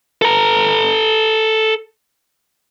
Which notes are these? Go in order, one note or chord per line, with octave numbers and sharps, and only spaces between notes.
A4 A#5